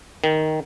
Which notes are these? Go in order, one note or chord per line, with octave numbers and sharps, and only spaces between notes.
D#3